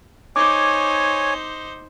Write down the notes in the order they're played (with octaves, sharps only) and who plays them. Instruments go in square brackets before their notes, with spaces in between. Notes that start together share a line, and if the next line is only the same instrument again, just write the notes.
[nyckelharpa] D#4 C5 [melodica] C#5 G#5 [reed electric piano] D6